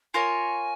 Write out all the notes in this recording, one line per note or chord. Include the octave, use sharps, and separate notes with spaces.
F4 A#4 C#5 G#5